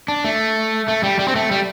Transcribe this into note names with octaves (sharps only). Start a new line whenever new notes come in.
D4
A3
A3
G3
G3
C4
A3
G3